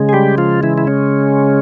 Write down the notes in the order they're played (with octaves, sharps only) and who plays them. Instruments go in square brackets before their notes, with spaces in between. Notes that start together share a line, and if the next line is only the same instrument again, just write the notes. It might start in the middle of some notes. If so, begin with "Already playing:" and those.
Already playing: [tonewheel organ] C#3 G#3
G#4
G3 G4
F3 F4
E3 E4
E4
C#4